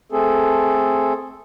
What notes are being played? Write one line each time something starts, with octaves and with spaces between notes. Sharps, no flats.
A3 C4 G#4 A4